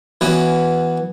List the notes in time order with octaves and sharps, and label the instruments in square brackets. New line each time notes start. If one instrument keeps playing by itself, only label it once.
[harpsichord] E3 B3 C#4 F#4